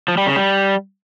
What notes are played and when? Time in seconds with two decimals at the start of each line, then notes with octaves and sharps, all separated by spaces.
0.08 F3
0.18 G3
0.27 C#3
0.36 G3